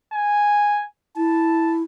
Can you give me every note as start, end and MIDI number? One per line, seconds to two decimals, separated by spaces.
0.13 0.85 80
1.17 1.83 64
1.17 1.76 81